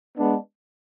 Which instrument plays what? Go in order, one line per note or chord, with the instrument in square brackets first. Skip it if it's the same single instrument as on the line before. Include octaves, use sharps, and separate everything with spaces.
[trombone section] G#3 B3 D4